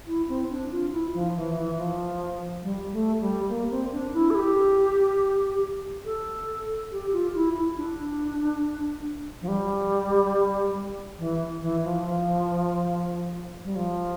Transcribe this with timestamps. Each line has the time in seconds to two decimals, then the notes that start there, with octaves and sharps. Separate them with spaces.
0.07 E4
0.28 C4
0.50 D4
0.71 F4
0.92 E4
1.14 F3
1.36 E3
1.56 E3
1.78 F3
2.63 G3
2.93 A3
3.20 G3
3.49 A#3
3.70 C4
3.92 D4
4.13 E4
4.30 A4
4.35 G4
6.05 A4
6.92 G4
7.13 F4
7.35 E4
7.56 E4
7.77 D4
9.42 F3
9.48 G3
11.19 E3
11.62 E3
11.84 F3
12.05 F3
13.64 G3
13.76 F3